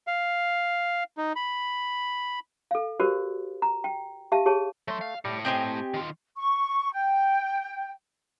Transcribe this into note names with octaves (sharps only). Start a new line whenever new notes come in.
F5
D#4
B5
A4 F5
F#4 G4 A#4 C5 D5
A#5
G5
G4 E5 F5 A5
G4 G#4 C#5 A5
F#3 A3 C6
F5
A2 G3
C4 G4 C5 D#5 G5 G#5
D#3 F4
C#6
G5